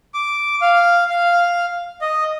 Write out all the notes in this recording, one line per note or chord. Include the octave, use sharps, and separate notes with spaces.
D6
F5
F5
D#5